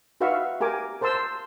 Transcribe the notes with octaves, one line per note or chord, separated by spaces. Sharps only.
D#4 F#4 B4 E5 F5 C#6
G4 A#4 G#5 D6
A#4 C5 A5 C6 E6